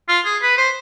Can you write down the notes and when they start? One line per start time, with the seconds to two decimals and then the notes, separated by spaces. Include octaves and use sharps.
0.08 F4
0.25 G#4
0.42 B4
0.57 C5